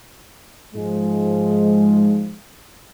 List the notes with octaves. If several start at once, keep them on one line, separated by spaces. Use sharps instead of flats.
G#2 F3 G#3